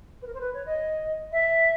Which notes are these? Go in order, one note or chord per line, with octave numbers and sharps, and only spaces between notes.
B4
A#4
C5
B4
C#5
D#5
E5